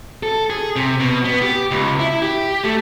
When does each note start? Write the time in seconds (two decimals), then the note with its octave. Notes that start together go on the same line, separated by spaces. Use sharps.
0.23 A4
0.50 G#4
0.76 C3
1.00 B2
1.25 B3
1.42 G4
1.71 C#2
1.99 E4
2.22 G4
2.64 A3